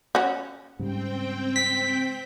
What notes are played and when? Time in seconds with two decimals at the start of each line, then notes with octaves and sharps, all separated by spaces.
0.15 C#4 F#4
0.79 G#2 C#3 G3 C4 G5
1.56 B6